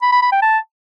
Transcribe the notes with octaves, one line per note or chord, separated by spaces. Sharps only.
B5
B5
B5
G5
A5